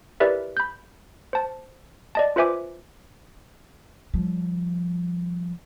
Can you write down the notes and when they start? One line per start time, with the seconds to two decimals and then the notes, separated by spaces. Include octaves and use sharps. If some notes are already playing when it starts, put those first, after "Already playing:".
0.20 E4 G4 A#4 B4 D5 E5
0.57 B5 G6
1.33 C5 A5
2.15 D5 D#5 A5
2.36 F4 B4 C5 E5 G#5 D6
4.14 F3 G3